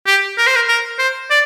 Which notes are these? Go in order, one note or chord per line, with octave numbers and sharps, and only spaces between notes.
G4
A#4
C5
A#4
A#4
C5
D5